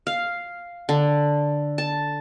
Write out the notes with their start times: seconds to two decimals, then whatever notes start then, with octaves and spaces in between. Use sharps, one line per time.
0.07 F5
0.89 D3
1.78 A5